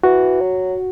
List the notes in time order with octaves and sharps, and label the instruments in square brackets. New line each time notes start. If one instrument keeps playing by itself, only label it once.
[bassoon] E3 [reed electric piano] F#4
[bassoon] F#3